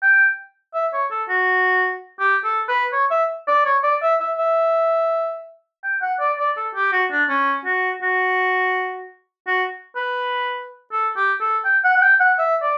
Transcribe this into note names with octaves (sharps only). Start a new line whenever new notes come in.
G5
E5
C#5
A4
F#4
G4
A4
B4
C#5
E5
D5
C#5
D5
E5
E5
E5
G5
F#5
D5
D5
A4
G4
F#4
D4
C#4
F#4
F#4
F#4
B4
A4
G4
A4
G5
F#5
F#5
G5
F#5
E5
D5